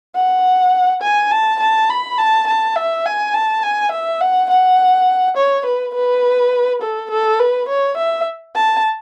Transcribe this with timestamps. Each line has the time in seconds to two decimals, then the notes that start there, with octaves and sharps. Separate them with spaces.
0.15 F#5
1.02 G#5
1.31 A5
1.60 A5
1.89 B5
2.18 A5
2.47 A5
2.76 E5
3.05 G#5
3.34 A5
3.63 G#5
3.92 E5
4.21 F#5
4.50 F#5
5.37 C#5
5.65 B4
5.94 B4
6.81 A4
7.10 A4
7.39 B4
7.69 C#5
7.97 E5
8.55 A5